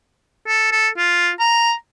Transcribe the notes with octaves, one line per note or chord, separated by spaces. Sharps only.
A4
A4
F4
A#5